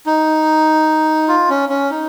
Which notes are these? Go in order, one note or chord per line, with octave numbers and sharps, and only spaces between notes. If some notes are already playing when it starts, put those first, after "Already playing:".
D#4
F4
C#4
C#4
D#4